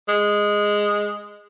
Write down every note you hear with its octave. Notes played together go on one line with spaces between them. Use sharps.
G#3